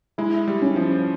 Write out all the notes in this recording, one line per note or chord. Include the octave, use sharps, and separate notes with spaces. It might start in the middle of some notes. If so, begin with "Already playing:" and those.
G#3 E4
G3
C#4
F3